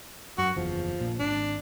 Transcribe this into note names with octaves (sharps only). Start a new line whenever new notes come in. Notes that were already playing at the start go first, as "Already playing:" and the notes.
F#2 F#4
F#1 E2 F3
A#1 A#2
G#1 D4